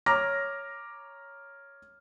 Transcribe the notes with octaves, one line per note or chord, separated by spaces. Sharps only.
C#5 A#5 D6 F6 A#6